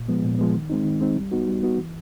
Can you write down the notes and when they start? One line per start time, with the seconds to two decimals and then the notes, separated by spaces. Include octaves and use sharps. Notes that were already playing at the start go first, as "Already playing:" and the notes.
Already playing: A#2
0.08 F3 G#3 B3
0.24 A#2
0.39 F3 G#3 B3
0.54 D#3
0.70 G#3 C4 D#4
0.85 D#3
1.01 G#3 C4 D#4
1.16 G3
1.32 B3 D#4 F#4
1.47 G3
1.63 B3 D#4 F#4
1.78 E3